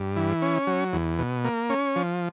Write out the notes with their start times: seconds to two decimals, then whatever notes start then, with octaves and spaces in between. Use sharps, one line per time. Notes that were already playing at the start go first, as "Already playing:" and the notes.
Already playing: G2
0.16 E3
0.42 C#4
0.67 F#3
0.93 E2
1.19 B2
1.44 A#3
1.70 C#4
1.96 F3